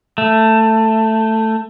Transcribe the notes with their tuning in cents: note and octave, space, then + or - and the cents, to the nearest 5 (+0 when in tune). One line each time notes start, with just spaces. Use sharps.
A3 +10